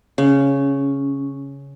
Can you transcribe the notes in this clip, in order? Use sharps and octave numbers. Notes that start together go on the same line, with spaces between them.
C#3 C#4